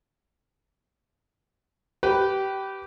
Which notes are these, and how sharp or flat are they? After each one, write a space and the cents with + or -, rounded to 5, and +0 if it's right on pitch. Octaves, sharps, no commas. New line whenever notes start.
G4 -20 B4 +0